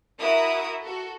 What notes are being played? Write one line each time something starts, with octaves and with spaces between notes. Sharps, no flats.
E4 F#4 A#4 E5 D#6
F#4 A4